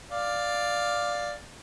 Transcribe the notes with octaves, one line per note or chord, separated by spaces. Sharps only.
D5 F5